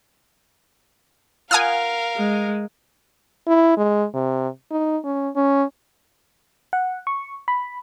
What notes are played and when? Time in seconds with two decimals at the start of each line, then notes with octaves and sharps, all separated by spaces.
1.51 F4 A#4 F5 F#5 G#5 D#6 F6
2.16 G#3
3.47 E4
3.77 G#3
4.14 C3
4.71 D#4
5.05 C#4
5.36 C#4
6.73 F#5
7.07 C#6
7.48 B5